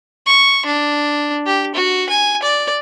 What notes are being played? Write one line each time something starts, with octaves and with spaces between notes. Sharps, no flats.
C#6
D4
G4
F#4
G#5
D5